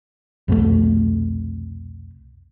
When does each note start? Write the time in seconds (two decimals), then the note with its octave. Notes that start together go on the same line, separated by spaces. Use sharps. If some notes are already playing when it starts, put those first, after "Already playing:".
0.48 C2 F2 B2 A3